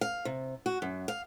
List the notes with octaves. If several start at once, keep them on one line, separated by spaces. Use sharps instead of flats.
F5
C3
F#4
F#2
F5